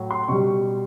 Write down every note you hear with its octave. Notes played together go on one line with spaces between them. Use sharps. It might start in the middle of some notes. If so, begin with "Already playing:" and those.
Already playing: A2 F#3
C6
B2 G3 C#6